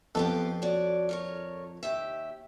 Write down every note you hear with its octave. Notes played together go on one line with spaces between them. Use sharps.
F2 B3 F4 G4 A4
F#4 C#5 D5
F4 A#4 C#5
D#2 G4 E5